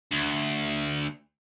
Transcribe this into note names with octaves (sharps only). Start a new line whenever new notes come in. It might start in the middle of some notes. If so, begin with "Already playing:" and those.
D2